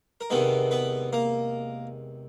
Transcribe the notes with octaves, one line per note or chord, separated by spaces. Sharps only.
A#4
E2 C3 D#3 G#3 B3 B4
B3 B4
A#3 A#4